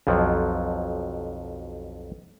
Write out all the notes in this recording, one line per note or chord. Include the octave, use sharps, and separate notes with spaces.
B1 F2 F3 F#3